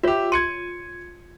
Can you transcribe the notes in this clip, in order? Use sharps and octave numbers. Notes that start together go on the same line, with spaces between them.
F4 G4 C#5 E5
C6 G#6 C#7 D#7